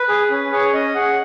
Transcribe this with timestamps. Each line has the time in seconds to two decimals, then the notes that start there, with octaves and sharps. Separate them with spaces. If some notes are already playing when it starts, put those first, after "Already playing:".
Already playing: B4
0.09 G#4
0.30 C#4
0.52 G#4 C#5
0.74 C#4 D#5
0.95 G#4 F#5